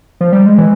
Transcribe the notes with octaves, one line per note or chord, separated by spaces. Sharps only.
F3
G3
G#3
E3